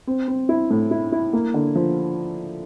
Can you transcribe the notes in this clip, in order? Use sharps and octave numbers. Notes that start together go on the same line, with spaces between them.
C4
C4
E4
A2
E4
E4
A#3
D3
F3